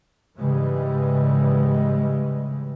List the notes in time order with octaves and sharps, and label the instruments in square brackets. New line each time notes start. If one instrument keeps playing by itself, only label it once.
[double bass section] G#2 C#3 E3 G3 G#3